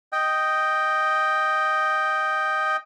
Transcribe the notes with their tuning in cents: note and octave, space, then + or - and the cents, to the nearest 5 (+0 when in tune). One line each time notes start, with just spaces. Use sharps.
D#5 +0 G5 +0